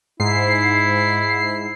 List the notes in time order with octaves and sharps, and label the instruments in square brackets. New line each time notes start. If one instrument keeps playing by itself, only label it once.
[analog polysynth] G#2 C7 [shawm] E4